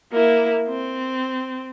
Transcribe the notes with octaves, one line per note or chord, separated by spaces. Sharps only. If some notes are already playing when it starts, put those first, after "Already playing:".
A#3 E4
C4